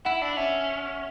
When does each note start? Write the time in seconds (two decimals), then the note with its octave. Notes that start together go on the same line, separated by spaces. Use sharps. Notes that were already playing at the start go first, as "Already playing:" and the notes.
0.05 E4 F#5
0.22 D4
0.37 C#4 E5